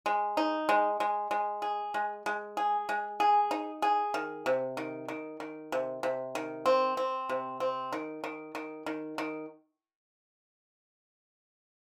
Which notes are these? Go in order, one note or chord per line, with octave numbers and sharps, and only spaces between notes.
G#3
D#4
G#3
G#3
G#3
G#4
G#3
G#3
G#4
G#3
G#4
D#4
G#4
D#3
C3
D#3
D#3
D#3
C3
C3
D#3
C4
C4
C3
C4
D#3
D#3
D#3
D#3
D#3